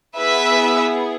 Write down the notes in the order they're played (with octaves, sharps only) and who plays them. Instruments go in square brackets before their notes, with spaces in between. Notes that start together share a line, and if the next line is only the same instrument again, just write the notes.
[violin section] B3 E4 G#4 B4 E5